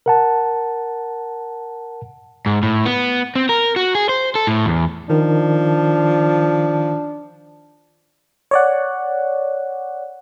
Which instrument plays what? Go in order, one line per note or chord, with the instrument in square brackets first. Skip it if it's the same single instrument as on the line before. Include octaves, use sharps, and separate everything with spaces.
[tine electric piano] A#4 F#5 A5
[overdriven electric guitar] G#2
A2
B3
C4
A#4
F#4
G#4
C5
A4
A2
E2
[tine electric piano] D#3 [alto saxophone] F3 [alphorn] D4
[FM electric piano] C#5 D5 F#5